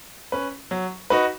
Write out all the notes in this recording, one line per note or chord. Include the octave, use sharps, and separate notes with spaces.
C#4 B4
F#3
D#4 F#4 B4